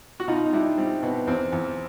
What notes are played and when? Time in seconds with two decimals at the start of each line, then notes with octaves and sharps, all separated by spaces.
0.20 F#4
0.28 B2 D#4 F4
0.46 D#4
0.53 G3 D4 E4
0.78 G3 C4
1.03 B2 B3
1.27 E2 C4
1.52 E2